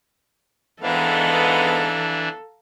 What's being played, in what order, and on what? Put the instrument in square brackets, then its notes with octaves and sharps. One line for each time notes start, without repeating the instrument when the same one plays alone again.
[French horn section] G#2 B3 [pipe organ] E3 D4 [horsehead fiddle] A4 [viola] F5 A#5